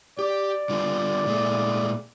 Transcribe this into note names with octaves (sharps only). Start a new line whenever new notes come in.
G4 D5
D3 G3 F4
A#2 G#3 A3